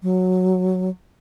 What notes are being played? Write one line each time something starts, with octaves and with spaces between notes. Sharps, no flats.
F#3